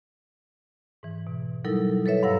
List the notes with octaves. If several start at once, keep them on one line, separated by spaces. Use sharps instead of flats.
G#2 E3
B2
F#3 G3 D#4 E4 A4 A#4
A4 B4 C#5 E5
G2 F5 F#5 A#5 E6 A#6